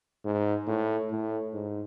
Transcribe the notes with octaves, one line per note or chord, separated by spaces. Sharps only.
G#2
A2
A2
G#2